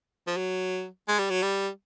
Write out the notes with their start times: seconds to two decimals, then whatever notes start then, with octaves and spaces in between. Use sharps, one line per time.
0.27 F3
0.37 F#3
1.08 G#3
1.19 G3
1.30 F#3
1.42 G3